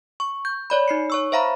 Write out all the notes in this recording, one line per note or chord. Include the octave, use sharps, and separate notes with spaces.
C#6
G6
C#5 D5 B5
D#4 C7 C#7
C#5 C#6 E6
C5 E5 F5 A#5 B5